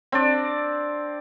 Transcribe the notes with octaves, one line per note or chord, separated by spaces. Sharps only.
C4 D4 D5